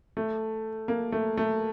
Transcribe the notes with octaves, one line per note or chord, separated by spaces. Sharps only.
A3
A#3
A3
A3